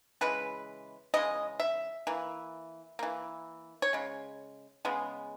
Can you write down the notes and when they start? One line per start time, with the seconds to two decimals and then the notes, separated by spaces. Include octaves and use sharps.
0.21 C#3 E3 G#3 B4
1.14 C#3 E3 G#3 D#5
1.60 E5
2.07 E3 A#3
2.99 E3 A#3
3.82 C#5
3.93 C#3 G#3
4.85 C#3 G#3 B3